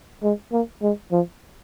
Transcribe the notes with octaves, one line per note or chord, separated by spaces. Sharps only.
G#3
A#3
G#3
F3